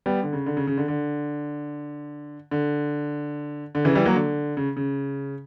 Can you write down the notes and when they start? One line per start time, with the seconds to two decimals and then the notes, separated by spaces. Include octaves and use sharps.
0.06 G3 B3
0.23 D3
0.33 C#3
0.46 D3
0.57 C#3
0.67 C#3
0.78 D3
0.88 D3
2.51 D3
3.75 D3
3.85 C#3 E3
3.95 E3 G3
4.06 F#3 A#3
4.15 D3
4.57 C#3
4.77 C#3